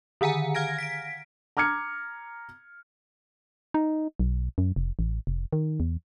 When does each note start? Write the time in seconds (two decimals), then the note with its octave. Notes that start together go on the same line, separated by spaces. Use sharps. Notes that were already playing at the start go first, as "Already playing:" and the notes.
0.21 D3 D#3 F#5 G#5 A#5
0.55 F5 F6 G#6 A#6 D7
0.79 B6 D7
1.57 A#5 D6 F6 G#6 C#7
3.74 D#4
4.20 B1
4.58 F#2
4.76 F1
4.99 A1
5.27 F1
5.53 D#3
5.80 E2